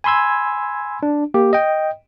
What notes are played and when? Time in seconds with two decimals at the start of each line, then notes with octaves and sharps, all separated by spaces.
0.04 G#5 B5 C6 E6 G#6
1.03 D4
1.34 A#3 G4
1.53 D#5 G5